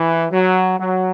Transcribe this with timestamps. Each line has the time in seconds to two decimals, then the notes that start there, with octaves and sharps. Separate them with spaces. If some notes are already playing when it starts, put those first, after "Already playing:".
Already playing: E3
0.31 F#3
0.78 F#3